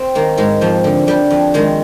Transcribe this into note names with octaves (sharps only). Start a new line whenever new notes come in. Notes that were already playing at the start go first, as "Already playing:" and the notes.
Already playing: C4
D#3 A#3
G#2 G#3
F2 F3
D3
D3 G3
F2
D#3 G#3